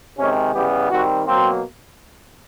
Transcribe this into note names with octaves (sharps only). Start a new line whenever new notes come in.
C3 D#3 G#3 C#4
C#3 E3 G3 B3 G4
D#3 G3 C4 F#4
B2 F#3 A#3 C4